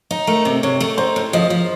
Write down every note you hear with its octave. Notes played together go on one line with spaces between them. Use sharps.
D#4
A3 A#4
C3
C3 C#5
A3
D#4 C5
A2
F3 D#5
F3